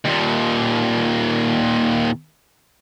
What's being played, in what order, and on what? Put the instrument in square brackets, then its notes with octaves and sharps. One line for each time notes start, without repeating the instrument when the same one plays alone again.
[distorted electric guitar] D#2 A#2